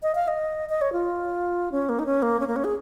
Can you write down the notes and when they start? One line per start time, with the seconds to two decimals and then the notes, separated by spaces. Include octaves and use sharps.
0.03 D#5
0.15 F5
0.28 D#5
0.69 D#5
0.81 C#5
0.93 F4
1.72 C#4
1.89 A#3
1.99 D#4
2.06 C#4
2.22 A#3
2.40 C#4
2.47 A#3
2.56 C#4
2.64 G#4